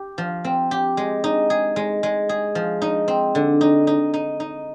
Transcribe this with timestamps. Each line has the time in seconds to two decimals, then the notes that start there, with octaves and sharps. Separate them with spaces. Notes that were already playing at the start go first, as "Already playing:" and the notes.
Already playing: G4
0.18 F3
0.45 C4
0.71 G4
0.97 G#3
1.24 D#4
1.50 G#4
1.76 G#3
2.03 G#3
2.29 G#4
2.55 F3
2.82 D#4
3.08 C4
3.35 D3
3.61 D#4
3.87 D#4
4.14 D#4
4.40 D#4